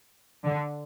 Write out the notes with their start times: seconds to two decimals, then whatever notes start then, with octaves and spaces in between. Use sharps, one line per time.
0.45 D3